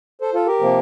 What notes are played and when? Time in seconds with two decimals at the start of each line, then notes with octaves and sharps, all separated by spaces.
0.21 A4 C5
0.34 F4 A4
0.47 G4 A#4
0.60 C3 F3 A#3